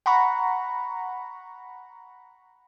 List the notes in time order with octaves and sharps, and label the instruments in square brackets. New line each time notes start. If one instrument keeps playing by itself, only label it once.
[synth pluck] F#5 A#5 B5 C#6